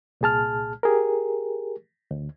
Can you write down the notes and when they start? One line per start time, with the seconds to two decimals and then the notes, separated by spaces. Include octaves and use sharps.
0.21 C2 A#2 G#4 A5 F6
0.83 G4 G#4 A#4
2.11 D2